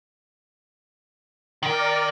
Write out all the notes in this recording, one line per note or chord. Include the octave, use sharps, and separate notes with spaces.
D#3 A#4 D5 G5